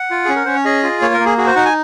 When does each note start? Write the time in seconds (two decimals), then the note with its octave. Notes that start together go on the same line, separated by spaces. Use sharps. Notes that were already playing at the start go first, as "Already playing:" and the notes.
Already playing: F#5
0.11 F4
0.25 C#4 G#4
0.35 A#4
0.45 C#4 C5
0.55 C#5
0.65 G#4 D#5
0.83 F4
1.02 A#3 C#5
1.14 A#4
1.20 A#3
1.26 G#4
1.37 F#4 G#4
1.47 C5
1.56 D#4 F#5
1.65 G#5